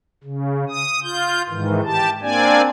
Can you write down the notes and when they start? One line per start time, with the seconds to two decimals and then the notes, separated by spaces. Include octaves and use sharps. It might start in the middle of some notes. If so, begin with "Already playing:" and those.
0.24 C#3
0.69 D#6
1.03 F4 G6
1.49 G#2 D#3 E3
1.84 G4 A5
2.22 A#3 C4 D4 D5 G#5